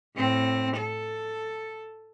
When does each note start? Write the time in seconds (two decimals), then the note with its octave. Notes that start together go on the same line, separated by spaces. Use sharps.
0.16 A2 C4
0.77 A4